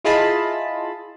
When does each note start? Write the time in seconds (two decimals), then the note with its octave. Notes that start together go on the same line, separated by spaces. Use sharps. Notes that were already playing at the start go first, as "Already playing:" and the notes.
0.04 E4 F4 G#4 D#5 A5 B5